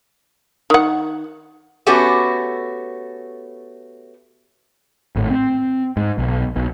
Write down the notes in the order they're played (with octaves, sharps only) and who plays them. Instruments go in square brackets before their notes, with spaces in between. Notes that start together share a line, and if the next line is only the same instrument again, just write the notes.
[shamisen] D#3 F#5
[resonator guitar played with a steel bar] A3 B3 C#4 F#4 G4 A4
[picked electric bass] G#1 A2
C4
G#2
B1
B1 B2